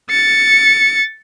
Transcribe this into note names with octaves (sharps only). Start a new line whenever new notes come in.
A6 C#7